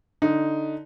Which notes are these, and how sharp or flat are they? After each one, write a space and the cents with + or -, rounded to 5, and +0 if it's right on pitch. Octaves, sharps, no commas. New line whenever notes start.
D3 +0 D#4 +0